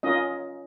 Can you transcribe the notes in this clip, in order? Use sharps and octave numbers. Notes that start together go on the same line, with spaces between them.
C#4 F4 A#4 D#5